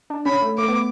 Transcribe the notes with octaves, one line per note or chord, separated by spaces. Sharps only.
D4
C#4 B5
A3
A3 D6
B3